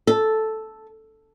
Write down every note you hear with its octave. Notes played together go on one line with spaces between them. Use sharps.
A4